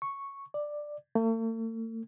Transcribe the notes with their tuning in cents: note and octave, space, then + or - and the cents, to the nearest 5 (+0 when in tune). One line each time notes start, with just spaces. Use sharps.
C#6 -5
D5 +10
A3 +45